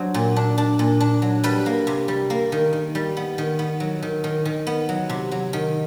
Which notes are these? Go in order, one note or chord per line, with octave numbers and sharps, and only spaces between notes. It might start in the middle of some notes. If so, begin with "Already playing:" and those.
Already playing: F#3 D4 C5
A#2
D4
D4
A#2
D4
F#3
G3 B4
A#3
C3
G3
A#3
D#3
D#3
G3
B3
D#3
B3
F#3
D#3
D#3
D#3
B3
F#3
C3
F#3
D#3